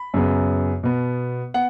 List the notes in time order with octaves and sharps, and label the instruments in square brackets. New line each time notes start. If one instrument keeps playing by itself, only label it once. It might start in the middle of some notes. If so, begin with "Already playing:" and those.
Already playing: [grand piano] B5
F#2 C#3 B3
B2 B3
B3 F#5